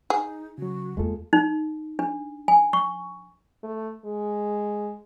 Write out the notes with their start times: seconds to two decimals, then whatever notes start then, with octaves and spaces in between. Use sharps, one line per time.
0.10 D#4 G#4
0.58 C#3 F#3 F#4
0.97 E2 G#3 A#3 F4 A4
1.33 D#4
1.99 D4
2.48 G#5
2.73 C#6
3.63 A3
4.05 G#3